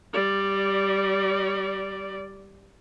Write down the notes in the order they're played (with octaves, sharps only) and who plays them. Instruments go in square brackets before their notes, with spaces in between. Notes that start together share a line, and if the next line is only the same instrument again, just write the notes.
[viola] G3 D5